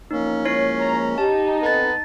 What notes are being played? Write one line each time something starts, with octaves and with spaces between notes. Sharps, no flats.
E2 F3 A#3 C#4 D#4
F3 G#3 A#3 E4 C#5 C7
A#5
D#4 G4 A5
B3 C4 A4 A5 A6